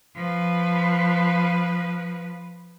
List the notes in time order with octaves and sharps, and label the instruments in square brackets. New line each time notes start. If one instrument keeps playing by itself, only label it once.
[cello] F3 B4